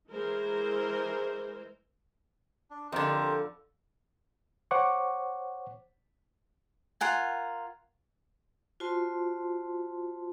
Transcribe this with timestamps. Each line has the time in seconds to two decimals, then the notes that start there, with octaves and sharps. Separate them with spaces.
0.11 E3 G#3 A#4 C5
2.71 D4
2.92 F2 D3 G4 A#4 C5
4.71 C5 C#5 F#5 C#6 D6
7.01 F4 A#4 F#5 G#5
8.80 F4 F#4 C5 A5 C6